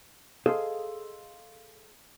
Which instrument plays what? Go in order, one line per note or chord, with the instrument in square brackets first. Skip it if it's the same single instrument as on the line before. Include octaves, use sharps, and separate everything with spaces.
[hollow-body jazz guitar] G#4 A4 C5 D#5 F5